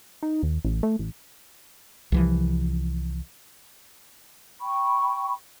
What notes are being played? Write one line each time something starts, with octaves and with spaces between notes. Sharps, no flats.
D#4
D#2
A1
A3
A1
C2 E3 F3
G5 B5 C#6